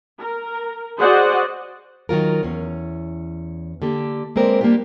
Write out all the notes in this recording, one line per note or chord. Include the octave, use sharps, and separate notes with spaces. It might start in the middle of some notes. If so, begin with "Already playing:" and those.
A#4
F#4 G#4 C5 D5 D#5 F#5
D#3 F#3 F4 A#4
E2 C#4
D3 A#3 G4 A4
G#3 A#3 C4 A#4 B4 D5
G3 A#3 C4 D4 F4 G4